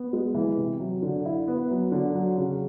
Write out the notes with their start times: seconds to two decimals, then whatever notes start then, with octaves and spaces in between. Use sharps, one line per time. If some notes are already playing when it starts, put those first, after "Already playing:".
Already playing: B3
0.13 G#3
0.34 E3
0.57 C3
0.79 F#3
1.02 D3
1.25 E4
1.48 B3
1.70 F#3
1.92 D3
2.15 F#3
2.38 C#3